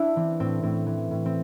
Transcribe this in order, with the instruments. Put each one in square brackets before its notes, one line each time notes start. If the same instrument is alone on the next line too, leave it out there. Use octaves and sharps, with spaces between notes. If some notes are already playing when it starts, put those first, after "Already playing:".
Already playing: [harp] D4 E4
E3 C4
A2 C4
A2 C4
E3
A2
C4